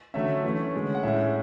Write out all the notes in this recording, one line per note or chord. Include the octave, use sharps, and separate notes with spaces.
D3 F#3 A3 C#4 E5
E3 A3 C#4
D3 G#3 C#4
F#5
A2 G#3 C#4 E5